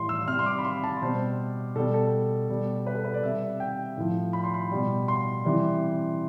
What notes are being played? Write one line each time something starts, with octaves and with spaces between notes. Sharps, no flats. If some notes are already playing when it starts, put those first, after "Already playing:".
Already playing: A2 E3 G3 C6
E6
C3 G3 F6
C6
D6
B5
C6
A5
B2 G3 C5
B2 G3 A4
A4
B2 G3
B4
A4
B4
D5
C3 G3 E5
G5
A2 F3
B5
C6
B5
B2 G3
C6
C3 E3 G3